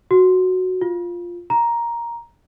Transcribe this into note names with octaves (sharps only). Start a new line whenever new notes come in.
F#4
F4
A#5